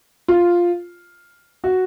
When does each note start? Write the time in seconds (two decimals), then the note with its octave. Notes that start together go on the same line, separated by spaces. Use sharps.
0.28 F4
1.64 F#4